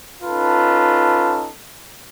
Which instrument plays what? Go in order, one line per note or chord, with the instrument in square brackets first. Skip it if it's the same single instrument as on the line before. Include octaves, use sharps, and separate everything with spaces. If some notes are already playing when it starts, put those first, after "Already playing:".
[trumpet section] C#4 D#4 F4 A4 B4 A5